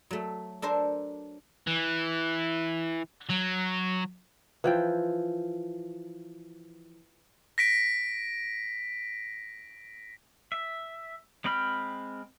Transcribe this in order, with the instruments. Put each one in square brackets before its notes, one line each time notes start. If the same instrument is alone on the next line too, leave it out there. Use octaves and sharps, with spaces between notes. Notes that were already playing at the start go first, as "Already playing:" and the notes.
[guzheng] F#3 A3
D4 A4 A#4 C5
[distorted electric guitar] E3
F#3
[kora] E3 F3 G5
[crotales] A#6 B6 D7
[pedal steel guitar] E5
G#3 C4 G5 B5 F6